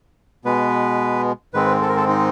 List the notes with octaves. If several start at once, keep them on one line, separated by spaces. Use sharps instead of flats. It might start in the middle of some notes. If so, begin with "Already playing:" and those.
B2 G#3 B3 B4
G#2 D#3 G#3 C4 B4
A4
A#4
A4
D#4